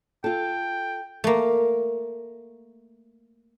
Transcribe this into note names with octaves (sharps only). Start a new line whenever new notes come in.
F4 A4 G5
A3 A#3